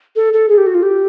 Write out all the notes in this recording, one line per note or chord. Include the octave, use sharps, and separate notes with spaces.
A4
A4
G#4
G4
F#4
F4
G4